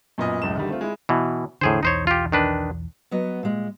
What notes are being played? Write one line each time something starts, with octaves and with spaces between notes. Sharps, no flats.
F#2 A#2 B3 D#5 D#6
C#2 F#2 A2 E7
D3 D#3 G3
A3 C4 F4
G#3 E4
B2 E3
E2 A2 D3 G#4 C5
B1 E2 D#4 C5 C#5
F4 G4
D#3 D4 B4
F#3 B3 D#5
A#2 G#3